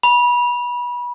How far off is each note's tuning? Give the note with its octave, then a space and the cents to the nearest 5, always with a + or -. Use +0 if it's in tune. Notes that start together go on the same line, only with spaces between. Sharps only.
B5 -25